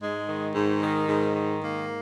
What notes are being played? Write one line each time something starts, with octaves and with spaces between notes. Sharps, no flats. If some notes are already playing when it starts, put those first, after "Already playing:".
G#2 G#3
D#3
G#2
D#3
G#2
D#3
G#2 A#3